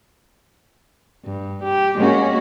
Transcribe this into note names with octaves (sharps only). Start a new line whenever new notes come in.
G2
G4
G#3 A#3 C#4 F#4